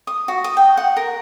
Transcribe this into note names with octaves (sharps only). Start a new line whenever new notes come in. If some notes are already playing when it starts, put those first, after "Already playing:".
D#6
F#4
D#6
G5
F#5
A#4